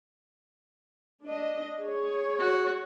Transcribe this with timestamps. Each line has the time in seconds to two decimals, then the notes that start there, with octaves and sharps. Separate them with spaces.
1.23 D4 D#5
1.82 G#4 C#5
2.39 F#4